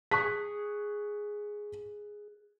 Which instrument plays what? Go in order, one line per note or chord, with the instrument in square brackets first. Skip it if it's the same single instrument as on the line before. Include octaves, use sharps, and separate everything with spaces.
[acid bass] G#4 [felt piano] C#6 F#6 B6